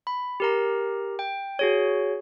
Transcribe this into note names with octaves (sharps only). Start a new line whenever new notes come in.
B5
G4 A#4 A#5
G5
F#4 G#4 C#5